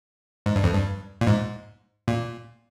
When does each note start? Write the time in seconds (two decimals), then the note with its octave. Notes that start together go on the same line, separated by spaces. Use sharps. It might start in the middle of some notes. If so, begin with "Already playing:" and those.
0.46 G#2
0.56 G2
0.64 F2
0.73 G2
1.21 A#2
1.27 G#2
2.08 A#2